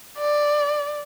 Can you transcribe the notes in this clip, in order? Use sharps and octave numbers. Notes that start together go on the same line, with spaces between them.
D5